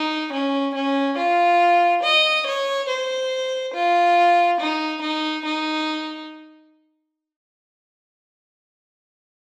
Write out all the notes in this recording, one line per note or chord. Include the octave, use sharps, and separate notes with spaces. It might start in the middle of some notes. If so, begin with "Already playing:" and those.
Already playing: D#4
C#4
C#4
F4
D#5
C#5
C5
F4
D#4
D#4
D#4